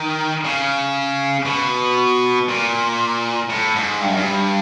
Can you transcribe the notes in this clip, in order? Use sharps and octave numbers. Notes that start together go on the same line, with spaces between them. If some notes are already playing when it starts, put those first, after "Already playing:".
Already playing: D#3
C#3
B2
A#2
A2
G#2
G2
F#2
G2